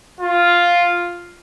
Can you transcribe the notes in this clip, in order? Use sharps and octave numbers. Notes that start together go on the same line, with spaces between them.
F4